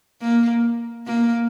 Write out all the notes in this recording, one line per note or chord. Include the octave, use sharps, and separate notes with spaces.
A#3
A#3